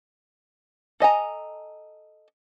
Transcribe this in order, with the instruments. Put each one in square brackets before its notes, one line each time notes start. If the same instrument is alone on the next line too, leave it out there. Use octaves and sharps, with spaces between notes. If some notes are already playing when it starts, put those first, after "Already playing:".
[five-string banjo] A4 D#5 G#5 A#5